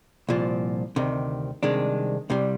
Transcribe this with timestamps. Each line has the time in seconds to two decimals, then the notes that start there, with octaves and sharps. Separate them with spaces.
0.29 C2 A#2 F3
0.96 D2 C3 D#3
1.63 C2 C3 D#3 G#3 D4
2.30 C2 C3 G3